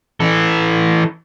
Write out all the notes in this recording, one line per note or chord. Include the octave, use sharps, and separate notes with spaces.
E3 A4